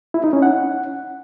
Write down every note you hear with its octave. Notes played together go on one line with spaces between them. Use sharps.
E4
D#4
C#4
F#5